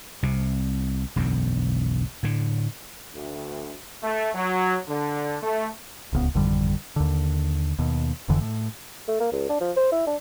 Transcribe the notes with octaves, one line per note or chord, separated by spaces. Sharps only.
C2 C3
E1 B1 F#2 D3
A2 D3
D2
A3
F#3
D3
A3
D1 C#2 B3
G#1 F2 D3 G3
D#2 D3
D#2 B2
F1 F2 D3 E3
A2
A3
A#3
C#2
D4
F3
C5
E4
D4